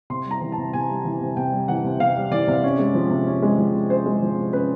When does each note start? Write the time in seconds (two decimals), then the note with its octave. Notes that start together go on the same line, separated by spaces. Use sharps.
0.10 C3 C6
0.26 G3
0.31 A#5
0.41 E3
0.52 A5
0.58 C3
0.73 C3 G#5
0.89 G3
1.05 E3
1.21 C3
1.37 C3 G5
1.52 G3
1.68 E3 F#5
1.84 C3
2.00 C3 F5
2.16 G3
2.31 E3 D5
2.48 C3
2.63 C#4
2.79 G#3
2.95 F3
3.11 C3
3.27 C#4
3.42 G#3
3.58 F3
3.74 C3
3.90 C#4 C5
4.06 G#3
4.22 F3
4.37 C3
4.53 C#4 B4